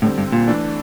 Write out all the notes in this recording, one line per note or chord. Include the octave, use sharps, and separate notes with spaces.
A2 D3 G3 C4
G2
A#2
E3 A3 D4 A4